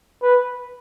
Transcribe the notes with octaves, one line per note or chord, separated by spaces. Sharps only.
B4